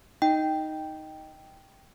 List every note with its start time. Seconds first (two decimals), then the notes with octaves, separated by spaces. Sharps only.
0.22 D#4 G5